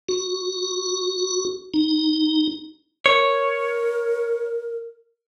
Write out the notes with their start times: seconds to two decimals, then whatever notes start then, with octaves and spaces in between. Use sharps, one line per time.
0.09 F#4
1.74 D#4
3.06 A#4 C#5